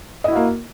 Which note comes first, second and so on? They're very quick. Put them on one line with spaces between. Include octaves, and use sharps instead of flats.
D#5 E4 F#4 A#3